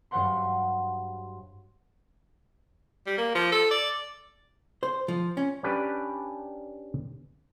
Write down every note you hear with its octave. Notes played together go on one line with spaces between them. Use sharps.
G2 F#3 B4 C5 F#5 C6
G3
A#3
F3
A4
D5
C5
F3
C#4
C#4 D4 G4 B4 D5